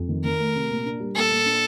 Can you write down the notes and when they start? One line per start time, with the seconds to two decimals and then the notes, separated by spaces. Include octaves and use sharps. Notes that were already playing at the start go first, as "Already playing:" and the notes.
Already playing: F2
0.09 D#3
0.24 D#3 A#4
0.39 A3
0.55 C3
0.69 A#2
0.86 D4
1.00 G3
1.15 A#2 A4
1.31 A#2
1.46 D4